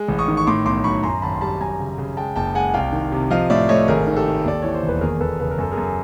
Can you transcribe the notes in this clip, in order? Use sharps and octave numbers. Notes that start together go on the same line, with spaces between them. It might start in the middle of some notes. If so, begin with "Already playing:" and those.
Already playing: G#3
A1
C#6 D#6
D#3
C#6
A2 C6 D6
B1 C6 D6
F#3 B5 C#6
F#2 A#5 C6
G#1 A5 B5
C6
G3 A5 B5
F#2 G#5 A#5
C#3
C#3
G#3 G5 A5
F#1 G5 A5
G#3 F#5 G#5
C2 F5 G5
D#3
C3
F3 D#5 F5
A2 D5 E5
A3 C#5 D#5
G#1 G#4 A#4
D#3
G4 A4
D#3
D#2 D5
E3 C#5
C5
E1
B4
D#2 G#4 A#4
D#2 A4 B4
C#3 B4
A#4
F#2 A4
G#4 A#4
F#2